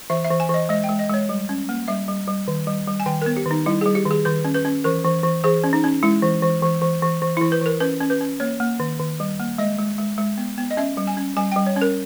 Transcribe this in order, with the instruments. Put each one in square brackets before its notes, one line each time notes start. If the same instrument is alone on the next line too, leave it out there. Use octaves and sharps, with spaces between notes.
[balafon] E3 E5
E5
E3
G#5
E3 D#5
G#3 D#5
G5
G#3
D#5
G#3 C#5
G3
C#4
A#3
G3 E5
G3
G3
D#3
G3
G3
G#5
D#3 G5
B3 A#4
G4
D#3
D#4
G3 E4
G3 G#4
G4
D#3 G#4
D#3 B4
C#4
B4
C#4
E3 A#4
E3
E3
E3 G#4
C#4
D#4
C#4
G#3 E4
E3
E3
E3
E3
E3
E3
E3 E4
B4
E3 A#4
C#4 B4
C#4
B4
C#4
A#3 C#5
A#3
D#3
D#3
G3
A#3
G#3 D#5
G#3
G#3
G#3
B3
B3
D#5
C#4 E5
G3
G#5
C#4
G3 G#5
G3 G5
C#5
C#4
A#4